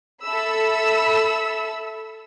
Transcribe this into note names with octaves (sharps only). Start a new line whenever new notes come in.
A4 E5 B5 E6